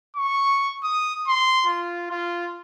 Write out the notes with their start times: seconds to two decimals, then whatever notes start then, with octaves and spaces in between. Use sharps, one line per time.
0.16 C#6
0.83 D#6
1.28 C6
1.67 F4
2.10 F4